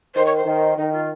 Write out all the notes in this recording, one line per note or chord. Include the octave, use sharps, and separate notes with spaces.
D#3 C5
C#5
C5
D#3
D#3 D#4
F4